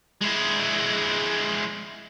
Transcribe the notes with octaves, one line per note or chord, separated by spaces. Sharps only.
G#3 E4